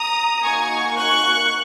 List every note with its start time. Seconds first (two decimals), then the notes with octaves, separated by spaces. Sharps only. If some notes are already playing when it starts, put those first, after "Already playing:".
Already playing: A#5 D#6
0.44 A#3 D#4 F#4 G#5 C#6
0.98 C#6 F#6